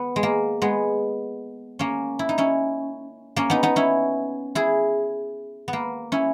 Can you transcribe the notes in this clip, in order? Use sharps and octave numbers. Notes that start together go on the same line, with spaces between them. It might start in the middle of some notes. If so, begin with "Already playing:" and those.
Already playing: B3
G#3
A#3
G#3 B3
A#3 C#4
E4
D#4
C#4 E4
A#3 C#4
B3 D#4
B3 D#4
C#4 E4
E4 G#4
B3
A#3
C#4 E4